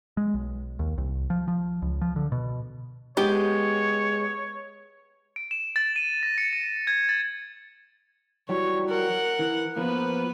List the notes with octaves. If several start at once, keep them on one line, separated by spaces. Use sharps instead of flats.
G#3
B1
D#2
C2
F3
F3
C#2
F3
D3
B2
G#3 B3 G4 C#5
D7
E7
A6
D#7
A#6
C#7
D#7
G#6
A6
E3 F#3 G3 C#5
A#4 F#5
E3
F3 A#3 B3 B4